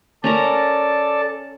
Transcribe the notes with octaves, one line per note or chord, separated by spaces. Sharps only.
C#4 A4 A#4 D5 A5 A#5